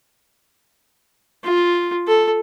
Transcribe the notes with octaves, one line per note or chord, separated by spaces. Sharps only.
F4
A4